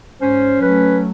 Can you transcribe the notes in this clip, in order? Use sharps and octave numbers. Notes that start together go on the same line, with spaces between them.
G#2 C#4 C5
F#3 A3 B4